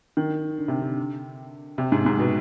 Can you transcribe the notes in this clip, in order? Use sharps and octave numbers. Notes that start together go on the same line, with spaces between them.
D#3
D3
C3
D3
C3
G#2
G#2
B2